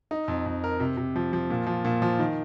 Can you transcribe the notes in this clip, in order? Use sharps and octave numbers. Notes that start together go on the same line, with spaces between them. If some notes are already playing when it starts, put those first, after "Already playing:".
D#4
F2
F2
A#4
C3
C3
F3
F3
A#2
F3
A#2
F3
D#3